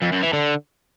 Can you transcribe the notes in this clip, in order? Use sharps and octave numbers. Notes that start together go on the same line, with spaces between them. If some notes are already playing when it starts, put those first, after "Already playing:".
F2
F#2
E3
D3